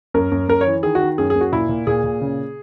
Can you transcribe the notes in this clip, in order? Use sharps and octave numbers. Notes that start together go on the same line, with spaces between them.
F#2 A#4
F#2
F#2 A#4
C#5
E3
D#3 G#4
F#4
D#3
F#2 G#4
G#4
F#2
F#4
A#2 E4
A#2
A#2 G#4
A#2
C#3